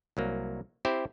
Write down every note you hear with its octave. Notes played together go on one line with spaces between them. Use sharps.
C2 F#3 A#3
C4 E4 G4 C5